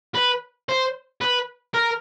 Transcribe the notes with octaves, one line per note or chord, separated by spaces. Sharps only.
B4
C5
B4
A#4